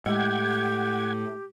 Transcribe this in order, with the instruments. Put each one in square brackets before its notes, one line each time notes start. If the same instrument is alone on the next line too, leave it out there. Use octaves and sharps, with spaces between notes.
[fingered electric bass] A2 [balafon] G#3 [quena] G4 [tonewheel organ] F#5 G5 G#6